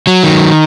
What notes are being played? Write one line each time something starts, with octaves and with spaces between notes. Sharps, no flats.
F#3
D#3